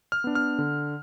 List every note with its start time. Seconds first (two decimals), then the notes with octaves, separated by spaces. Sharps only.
0.12 F6
0.24 B3 D4
0.35 F6
0.59 D3